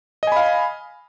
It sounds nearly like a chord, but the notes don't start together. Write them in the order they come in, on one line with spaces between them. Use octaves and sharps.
D#5 G#5 B5 F5